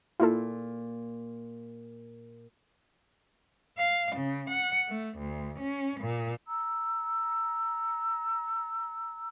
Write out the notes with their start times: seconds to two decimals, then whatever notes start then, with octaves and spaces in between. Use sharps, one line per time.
0.20 A#2 E4 F4 A4
3.77 F5
4.16 C#3
4.50 F#5
4.89 A3
5.18 D2
5.59 C#4
6.01 A#2
6.46 A#5 E6